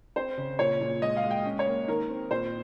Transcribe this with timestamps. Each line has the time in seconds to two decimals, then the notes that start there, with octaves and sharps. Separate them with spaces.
0.16 C4 C5
0.37 C#3
0.59 A#2 C#5
0.81 A#2
1.02 G#3 D#5
1.17 F5
1.24 G#3
1.31 G5
1.45 C#4
1.59 C#5
1.66 A#3
1.88 D#3 A#4
2.09 C4
2.31 A#2 C5